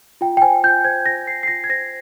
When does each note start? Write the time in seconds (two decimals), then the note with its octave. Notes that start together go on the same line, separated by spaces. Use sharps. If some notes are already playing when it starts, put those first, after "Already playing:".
0.21 F4 G5
0.37 G5
0.42 C5 G#5
0.64 F4 G6
0.84 C5 G#6
1.06 F4 A#6
1.27 C5 C7
1.43 C7
1.48 F4 A#6
1.64 G#6
1.70 C5 A#6